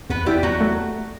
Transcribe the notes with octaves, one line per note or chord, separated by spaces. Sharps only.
E2 B3 B4
G3 E4 G4
E2 F#3 F#4
A3